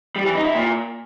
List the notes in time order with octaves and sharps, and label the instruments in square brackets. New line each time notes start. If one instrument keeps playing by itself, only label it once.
[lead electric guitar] G3
E3
D#4
E4
A#2